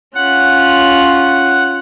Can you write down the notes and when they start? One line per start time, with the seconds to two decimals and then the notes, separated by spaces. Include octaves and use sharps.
0.15 C#4 F4 F#5